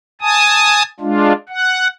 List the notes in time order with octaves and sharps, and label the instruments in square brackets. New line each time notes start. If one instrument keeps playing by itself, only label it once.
[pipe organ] G#5 A5 D#6
G#3 D4 F4
F#5